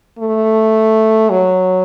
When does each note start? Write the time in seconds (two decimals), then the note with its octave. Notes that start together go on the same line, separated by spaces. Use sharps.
0.19 A3
1.30 F#3